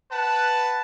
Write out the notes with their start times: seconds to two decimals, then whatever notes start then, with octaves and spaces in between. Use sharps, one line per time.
0.10 B4 F#5 A5